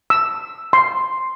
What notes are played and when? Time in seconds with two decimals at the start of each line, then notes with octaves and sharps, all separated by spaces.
0.10 E6
0.73 C6